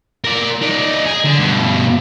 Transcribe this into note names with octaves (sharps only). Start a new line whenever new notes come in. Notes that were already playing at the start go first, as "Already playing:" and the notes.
A#4 D5
D#4 D5
G#4
D3
G2 B2